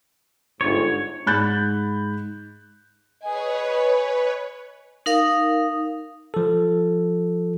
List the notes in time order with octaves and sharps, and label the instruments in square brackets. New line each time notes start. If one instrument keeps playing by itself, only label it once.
[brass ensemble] G1 G#2 [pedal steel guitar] C#5
[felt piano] G#2 B5 F#6 G6 A6
[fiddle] G#4 G#5 [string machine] B4 C#5 [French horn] D#5
[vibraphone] D#4 A#4 F5 D#6
[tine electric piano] F3 A4